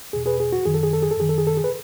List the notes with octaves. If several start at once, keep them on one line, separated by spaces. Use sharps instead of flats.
E2 B2 G#4
G#4 B4
G#4
F#4
F#2 D#3 G#4
A4
G#4
A4
G#4
A4
F#2 D#3 G#4
A4
G#4
A4
G#4
B4